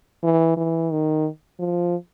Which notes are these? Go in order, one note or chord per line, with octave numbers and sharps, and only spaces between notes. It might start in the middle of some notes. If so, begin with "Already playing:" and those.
E3
E3
D#3
F3